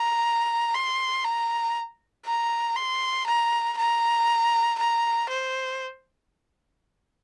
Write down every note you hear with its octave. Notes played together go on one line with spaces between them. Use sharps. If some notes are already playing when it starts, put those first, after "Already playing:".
Already playing: A#5
C6
A#5
A#5
C6
A#5
A#5
A#5
C5